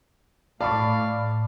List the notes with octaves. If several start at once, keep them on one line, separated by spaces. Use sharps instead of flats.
A2 D5 F5 A5 B5 C#6 D6